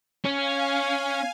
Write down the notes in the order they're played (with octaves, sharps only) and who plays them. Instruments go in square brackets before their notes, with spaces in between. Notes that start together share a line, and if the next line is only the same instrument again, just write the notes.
[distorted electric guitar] C#4 [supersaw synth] F5 G#5